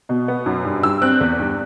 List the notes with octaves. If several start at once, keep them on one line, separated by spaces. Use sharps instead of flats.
B2
B3
F#2
G2
G2 E6
C4 F#6
E2
G2